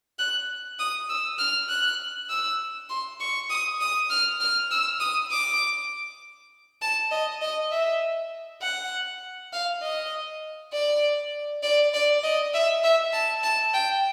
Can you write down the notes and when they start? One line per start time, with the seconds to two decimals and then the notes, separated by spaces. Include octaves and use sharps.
0.19 F#6
0.79 D#6
1.09 E6
1.39 F6
1.69 F#6
2.30 E6
2.90 C6
3.20 C#6
3.50 D#6
3.81 D#6
4.10 F6
4.40 F6
4.71 E6
5.00 D#6
5.31 D6
6.82 A5
7.11 D#5
7.42 D#5
7.72 E5
8.62 F#5
9.53 F5
9.82 D#5
10.73 D5
11.63 D5
11.94 D5
12.23 D#5
12.54 E5
12.84 E5
13.13 A5
13.43 A5
13.74 G5